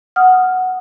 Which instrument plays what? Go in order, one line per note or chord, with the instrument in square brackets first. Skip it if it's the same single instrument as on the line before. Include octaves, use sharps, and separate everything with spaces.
[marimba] F#5 D#6 F6